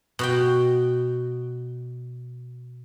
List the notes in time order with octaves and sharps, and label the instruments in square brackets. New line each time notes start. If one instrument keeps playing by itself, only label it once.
[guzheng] B2 F#4 G5